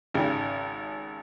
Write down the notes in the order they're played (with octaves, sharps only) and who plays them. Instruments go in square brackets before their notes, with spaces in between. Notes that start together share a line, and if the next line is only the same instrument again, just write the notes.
[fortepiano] G#1 C#3 G4